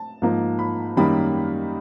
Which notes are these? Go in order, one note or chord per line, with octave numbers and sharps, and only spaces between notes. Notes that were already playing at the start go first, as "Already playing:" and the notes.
Already playing: A5
G#2 F3 A#3 D#4
B5
F#2 D#3 G3 A#3 D#4 B5